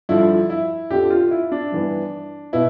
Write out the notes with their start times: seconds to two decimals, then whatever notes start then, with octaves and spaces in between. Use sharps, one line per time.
0.09 G2 D3 F3 E4
0.50 E4
0.90 F2 D3 F3 G4
1.10 F4
1.31 E4
1.52 D4
1.72 G2 E3 B3
2.53 B2 B3 E4